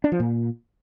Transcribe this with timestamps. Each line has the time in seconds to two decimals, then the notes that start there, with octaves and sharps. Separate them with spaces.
0.04 D4
0.12 F3
0.20 A#2